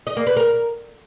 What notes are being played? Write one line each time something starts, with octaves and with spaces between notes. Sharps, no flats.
D#5
A#3
B4
A#4